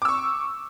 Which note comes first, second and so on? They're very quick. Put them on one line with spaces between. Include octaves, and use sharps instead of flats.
D6 E6 C#6